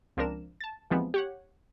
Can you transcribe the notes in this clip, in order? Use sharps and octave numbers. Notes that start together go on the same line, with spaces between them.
C#2 F3 C4 D4 A#4 E7
A5 A6
D#2 E3 F3 G#3 B3 C4
G4 C#5 F#5